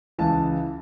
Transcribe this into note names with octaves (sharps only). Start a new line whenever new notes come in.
C#2 C#3 E3 A5